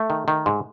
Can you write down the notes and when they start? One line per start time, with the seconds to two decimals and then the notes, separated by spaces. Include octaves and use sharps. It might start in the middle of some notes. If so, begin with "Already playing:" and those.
Already playing: A3
0.10 D#3
0.28 D#3
0.46 G#2